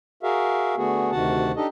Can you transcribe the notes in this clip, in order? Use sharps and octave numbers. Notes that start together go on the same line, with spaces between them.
F#4 G#4 A#4 E5 F5
D3 A3 B3 F#4 G#4
D2 C3 D#3 F#4 F#5 A5
D4 D#4 G4 A4 D#5